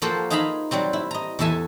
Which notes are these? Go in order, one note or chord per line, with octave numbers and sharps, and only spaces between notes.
F3 A#3 F#4 A4 C5 G5
D#4 F4 G#4 E5 A#5 B5
F#3 G3 C4 F#4
E4
D#5 A#5
E2 F#4 A4 E5 G#5